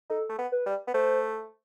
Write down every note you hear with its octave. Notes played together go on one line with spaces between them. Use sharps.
D#4 A4
A3
B3
B4
G3
B3
A3 C5